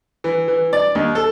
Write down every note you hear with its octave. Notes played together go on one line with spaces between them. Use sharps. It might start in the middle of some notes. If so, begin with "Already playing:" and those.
E3
E3
D5
D#2
A4